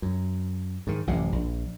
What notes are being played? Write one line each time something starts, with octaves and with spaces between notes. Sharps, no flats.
F#2
G#2 D#3
A1 F#2 C3
A#1